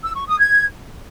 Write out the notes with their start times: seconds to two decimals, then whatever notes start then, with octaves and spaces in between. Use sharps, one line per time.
0.03 E6
0.15 C#6
0.26 D#6
0.38 G#6